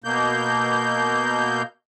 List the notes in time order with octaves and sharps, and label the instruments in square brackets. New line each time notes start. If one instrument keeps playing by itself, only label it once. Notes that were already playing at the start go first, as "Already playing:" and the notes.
[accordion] B2 A#3 G6